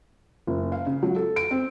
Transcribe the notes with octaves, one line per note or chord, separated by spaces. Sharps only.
F#1
F5
C#3
F#3
A4
D7
C4